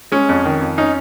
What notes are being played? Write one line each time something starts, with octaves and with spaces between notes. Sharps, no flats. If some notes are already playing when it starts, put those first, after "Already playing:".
G#3 C#4
F2
D#3
F2
C#4 D#4